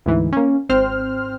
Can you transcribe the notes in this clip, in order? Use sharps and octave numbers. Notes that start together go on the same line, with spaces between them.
D2 G#2 E3
A#3 C#4
G#1 C4 C5 F6